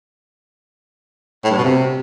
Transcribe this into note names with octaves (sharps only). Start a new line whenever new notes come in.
A2
G2
B2
C3